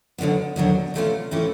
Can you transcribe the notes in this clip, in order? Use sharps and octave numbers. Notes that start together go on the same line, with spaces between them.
D#2 D3 F#3 B3
D#2 D3 F#3 B3
C3 E3 A3 C#4 F4
C3 E3 A3 C#4 F4